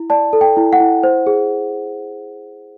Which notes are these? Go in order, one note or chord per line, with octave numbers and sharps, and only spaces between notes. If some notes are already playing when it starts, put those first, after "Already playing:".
Already playing: E4
D5 A5
A4
G5
E4
F#5
E4
C5
G#4